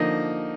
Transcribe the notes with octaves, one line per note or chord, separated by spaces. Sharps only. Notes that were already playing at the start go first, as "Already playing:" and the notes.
Already playing: D3 F3 A#3 D#4 D#5